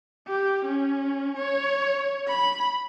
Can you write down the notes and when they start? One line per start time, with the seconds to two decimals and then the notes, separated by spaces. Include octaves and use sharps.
0.27 G4
0.65 C#4
1.37 C#5
2.28 B5